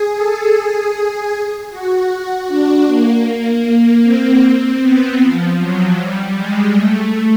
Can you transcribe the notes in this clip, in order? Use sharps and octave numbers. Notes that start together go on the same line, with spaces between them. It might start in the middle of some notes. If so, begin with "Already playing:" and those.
Already playing: G#4
A4
G#4
F#4
D4
A#3
A#3
C4
B3
F3
F#3
G3
G#3
A3